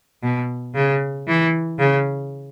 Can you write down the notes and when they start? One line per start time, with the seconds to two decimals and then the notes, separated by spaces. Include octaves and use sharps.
0.23 B2
0.75 C#3
1.28 E3
1.79 C#3